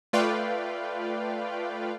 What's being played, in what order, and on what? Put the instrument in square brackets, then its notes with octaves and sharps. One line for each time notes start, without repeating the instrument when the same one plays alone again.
[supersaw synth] A3 F4 B4 D5 F5 G5